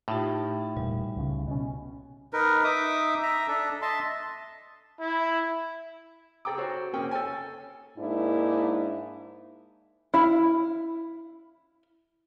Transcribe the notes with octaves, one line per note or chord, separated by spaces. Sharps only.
A2 D#4 F4 G4
E1 A#2 G3
C#2 C#3
B2 C#4
D#4 A#4 B4
D#4 E5 D6 D#6
E5 A#5
D4 A4
D#5 E5 A5 C6
E4
G#4 A4 G5 A#5 D6
F#4 C5 C#5
A#3 C4 C#4 G#4 G5
A4 C#5 G5 G#5
G#2 A#3 D4 E4
E4 F5